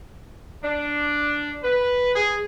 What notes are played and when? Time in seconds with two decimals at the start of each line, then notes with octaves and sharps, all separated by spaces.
0.63 D4
1.64 B4
2.14 G#4